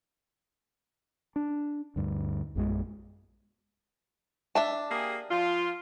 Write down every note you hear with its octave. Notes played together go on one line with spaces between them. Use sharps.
D4
D2 G2
A#1 F#2 D#3 G#3
D4 E5 A5
A#3 G4 G#4
F3 F4